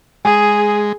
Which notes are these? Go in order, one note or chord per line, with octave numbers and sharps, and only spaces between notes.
G#3 G#4 G#5